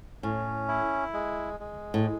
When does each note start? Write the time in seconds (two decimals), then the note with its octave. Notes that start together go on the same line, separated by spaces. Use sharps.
0.23 A2 C#4
0.68 E4
1.14 G#3
1.60 G#3
1.94 A2